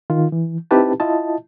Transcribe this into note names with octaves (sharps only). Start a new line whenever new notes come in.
D#3 F4
E3
C4 D#4 E4 G4 B4 A5
E4 F4 D#5 A5